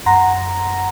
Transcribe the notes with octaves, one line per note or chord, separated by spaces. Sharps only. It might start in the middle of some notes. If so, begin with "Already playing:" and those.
F#2 F#5 A#5 C6 A#6